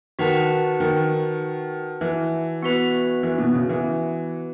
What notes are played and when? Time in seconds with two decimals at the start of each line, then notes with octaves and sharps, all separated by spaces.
0.19 D#3 F#4 B4 F#5 A5
0.80 D#3
2.01 E3
2.62 B3 F#4 B4
3.23 E3
3.38 B2
3.55 C#3
3.69 E3